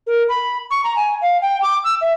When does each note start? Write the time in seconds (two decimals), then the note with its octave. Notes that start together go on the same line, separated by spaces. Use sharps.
0.07 A#4
0.29 B5
0.71 C#6
0.84 A#5
0.96 G#5
1.21 F5
1.42 G5
1.62 D6
1.84 E6
2.01 E5